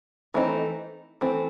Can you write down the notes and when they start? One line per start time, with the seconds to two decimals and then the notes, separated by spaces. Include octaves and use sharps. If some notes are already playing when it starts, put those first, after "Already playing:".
0.34 E3 A3 C4 D#4
1.21 E3 A3 C4